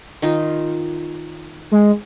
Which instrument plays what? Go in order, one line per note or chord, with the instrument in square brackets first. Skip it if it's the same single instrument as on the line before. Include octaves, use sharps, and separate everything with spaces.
[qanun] D#3 D#4 F4
[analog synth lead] G#3